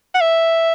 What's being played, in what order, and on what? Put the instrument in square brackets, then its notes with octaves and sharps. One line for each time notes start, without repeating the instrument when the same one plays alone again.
[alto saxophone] F#5
E5